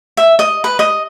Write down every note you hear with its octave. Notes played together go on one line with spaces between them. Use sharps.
E5
D#5
B4
D#5